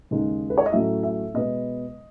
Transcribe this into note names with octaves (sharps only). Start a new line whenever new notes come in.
D#2 C#3 G#3 D#4
B4
C#5
D#5
A2 F#3 A3 C#4 E4 E5
E5
B2 G#3 B3 D#5